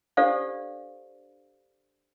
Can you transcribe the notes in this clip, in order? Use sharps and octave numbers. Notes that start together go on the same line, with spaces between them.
D4 G4 A4 C5 D5 F5